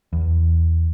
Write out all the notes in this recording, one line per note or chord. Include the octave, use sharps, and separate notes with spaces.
E2